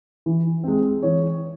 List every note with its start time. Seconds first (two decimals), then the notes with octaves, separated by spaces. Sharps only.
0.26 E3
0.64 G#3 C4
1.03 E3 C#5